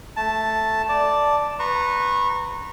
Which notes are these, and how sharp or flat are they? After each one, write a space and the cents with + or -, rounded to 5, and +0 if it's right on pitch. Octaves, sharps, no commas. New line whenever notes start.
A3 +0 A5 +0
D5 +0 A5 +0
B4 +0 A#5 -20 C#6 -30